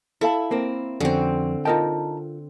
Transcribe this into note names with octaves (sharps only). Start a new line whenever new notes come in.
E4 A4 F5 A5
A#3 C4 A#4
F2 D3 C4 C#4 F#4
D#4 F4 A#4 D#5 G5 A5